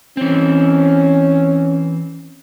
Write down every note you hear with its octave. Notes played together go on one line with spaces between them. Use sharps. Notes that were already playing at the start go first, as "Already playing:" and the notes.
E3 C4 C#4